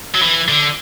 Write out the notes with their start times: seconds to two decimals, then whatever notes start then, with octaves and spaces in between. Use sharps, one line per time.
0.15 F#3
0.22 E3
0.49 D3